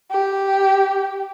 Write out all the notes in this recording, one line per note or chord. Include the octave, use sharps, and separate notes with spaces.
G4